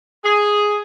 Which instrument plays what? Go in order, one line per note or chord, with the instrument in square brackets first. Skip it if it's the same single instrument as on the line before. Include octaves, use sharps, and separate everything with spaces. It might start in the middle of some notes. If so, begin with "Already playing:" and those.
[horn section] G#4